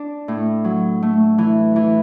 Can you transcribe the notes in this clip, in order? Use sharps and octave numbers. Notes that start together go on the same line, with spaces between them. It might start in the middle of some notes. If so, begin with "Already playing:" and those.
Already playing: D4
A2
F#3
A3
E3
E3